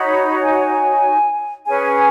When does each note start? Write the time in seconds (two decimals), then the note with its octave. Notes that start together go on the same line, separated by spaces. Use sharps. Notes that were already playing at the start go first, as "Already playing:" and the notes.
Already playing: D#4 F#4 C#5 B5
0.42 G#5
1.66 C#4 G#4 B4 G#5